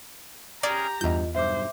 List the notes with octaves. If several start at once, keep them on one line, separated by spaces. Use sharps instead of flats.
C#4 G4 G#4 A#4 D5 A#5
E2 G2 F4 D#5 G6
B1 G2 C5 E5 D6